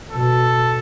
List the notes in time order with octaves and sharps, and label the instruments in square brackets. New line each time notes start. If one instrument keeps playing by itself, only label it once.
[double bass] B2 [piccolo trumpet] A4